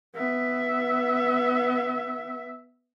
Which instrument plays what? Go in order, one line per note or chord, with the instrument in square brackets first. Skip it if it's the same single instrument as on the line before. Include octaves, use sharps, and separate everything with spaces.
[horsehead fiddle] B3 E5